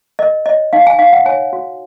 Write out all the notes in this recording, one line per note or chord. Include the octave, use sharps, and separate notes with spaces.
A#4 D#5
C#5 D#5
D#4 F5
G#5
D#4 F5
F#5
C#5 G#5
F#4